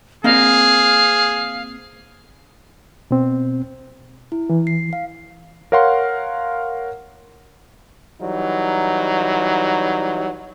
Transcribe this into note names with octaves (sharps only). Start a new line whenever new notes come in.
A#3 C4 G#4 D#5 F5
B2 C4
E4
E3
C7
F5
A#4 C#5 F5 F#5 C6
E3 F#3 G3 D#4